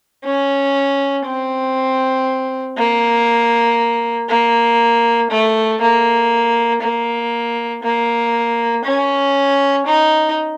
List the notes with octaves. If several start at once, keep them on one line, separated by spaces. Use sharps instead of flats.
C#4
C4
A#3
A#3
A3
A#3
A#3
A#3
C#4
D#4